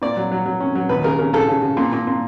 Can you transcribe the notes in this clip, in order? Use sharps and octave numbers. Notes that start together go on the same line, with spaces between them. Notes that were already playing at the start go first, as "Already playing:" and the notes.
A#2 D5
F#3
F#3
F#3
C#4
F#3
D#2 B4
C#3 A#4
C#3 A#4
C#3 A4
C#3
C#3
A#2
A#2
A#2